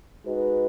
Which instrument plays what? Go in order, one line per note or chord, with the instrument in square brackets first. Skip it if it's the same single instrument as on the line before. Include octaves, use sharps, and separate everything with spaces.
[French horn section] G#3 D#4 F#4 B4